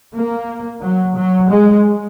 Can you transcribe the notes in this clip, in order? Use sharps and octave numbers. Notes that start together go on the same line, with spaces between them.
A#3
F#3
F#3
G#3